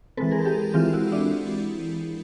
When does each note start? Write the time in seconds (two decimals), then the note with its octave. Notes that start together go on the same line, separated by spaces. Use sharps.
0.17 E3 G#3 C4 A4 B4
0.31 G#4 A#4
0.45 G4 A4
0.74 E3 G#3 C4 F4 G4
0.93 E4 F#4
1.12 D4 E4